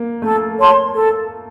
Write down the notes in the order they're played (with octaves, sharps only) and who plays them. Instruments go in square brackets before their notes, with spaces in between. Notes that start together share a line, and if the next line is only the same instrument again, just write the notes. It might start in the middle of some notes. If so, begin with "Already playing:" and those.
Already playing: [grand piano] A#3
[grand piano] A3 [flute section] A4
[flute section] C#5 A5 C6
A4